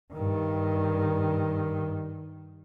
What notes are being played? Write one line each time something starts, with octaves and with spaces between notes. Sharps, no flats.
G2 D#3